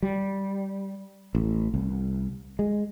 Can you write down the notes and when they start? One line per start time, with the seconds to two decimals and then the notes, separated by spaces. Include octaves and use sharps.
0.02 G3
1.35 A1
1.74 C2
2.59 G#3